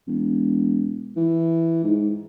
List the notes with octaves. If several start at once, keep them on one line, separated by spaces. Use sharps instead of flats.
E1
E3
G#2